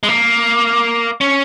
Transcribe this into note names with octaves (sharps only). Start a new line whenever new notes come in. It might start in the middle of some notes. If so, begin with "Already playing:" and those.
G#3
A#3
C#4